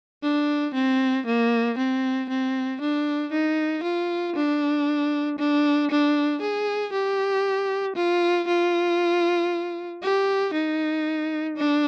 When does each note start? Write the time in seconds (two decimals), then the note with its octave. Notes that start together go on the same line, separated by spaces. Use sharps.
0.23 D4
0.75 C4
1.27 A#3
1.78 C4
2.29 C4
2.81 D4
3.32 D#4
3.83 F4
4.36 D4
5.38 D4
5.91 D4
6.41 G#4
6.93 G4
7.96 F4
8.48 F4
10.03 G4
10.54 D#4
11.57 D4